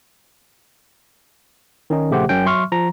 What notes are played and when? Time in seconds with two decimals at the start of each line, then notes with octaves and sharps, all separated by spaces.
1.90 D#3 C#4 D#4
2.10 A#1 C#3 A3 G4 C5 F#5
2.29 F#2 C#4 G5
2.45 F#3 E5 C6 C#6 F6
2.72 F3 A#5